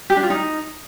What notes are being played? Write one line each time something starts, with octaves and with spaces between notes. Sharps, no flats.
G4
D4
F4
D#4